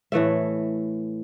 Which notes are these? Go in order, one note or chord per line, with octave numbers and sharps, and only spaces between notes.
A2 E3 A3 E5